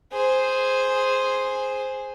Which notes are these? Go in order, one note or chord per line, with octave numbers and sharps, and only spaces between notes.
G#4 C5